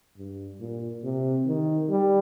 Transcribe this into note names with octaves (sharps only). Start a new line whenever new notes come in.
G2
A#2
C3
D#3
G3